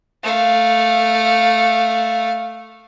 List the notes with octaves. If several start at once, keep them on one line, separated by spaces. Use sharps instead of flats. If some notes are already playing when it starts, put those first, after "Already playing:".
A3 F5